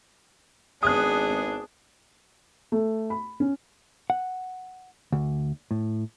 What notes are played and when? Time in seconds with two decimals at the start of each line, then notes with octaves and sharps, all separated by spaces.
0.83 G#1 B3 D4 G#4 D#6 F#6
2.72 A3
3.10 B5
3.40 C#4
4.10 F#5
5.12 D2
5.71 A2